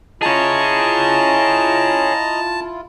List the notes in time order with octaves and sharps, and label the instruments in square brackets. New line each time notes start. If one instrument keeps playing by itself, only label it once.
[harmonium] E4 F4 [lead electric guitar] G#4 C#5 [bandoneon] D#5 A#5 [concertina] A5